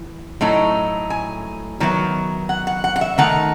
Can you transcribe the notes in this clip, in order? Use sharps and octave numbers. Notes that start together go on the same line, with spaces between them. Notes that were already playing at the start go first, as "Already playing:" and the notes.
Already playing: E3
A2 F#3 A3 D#4
G#5
D#3 F#3 B3 E4
F#5
F#5
F#5
F#5
E5
D#3 A3 D#4 F#5